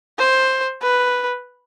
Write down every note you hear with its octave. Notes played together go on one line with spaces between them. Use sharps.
C5
B4